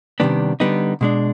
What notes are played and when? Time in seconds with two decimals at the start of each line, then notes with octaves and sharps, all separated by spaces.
0.20 C3 D#3 G3 B3 D4
0.60 D3 G3 B3 D#4
1.01 B2 G#3 D4